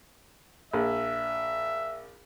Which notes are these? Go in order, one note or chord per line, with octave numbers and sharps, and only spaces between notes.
A#1 E5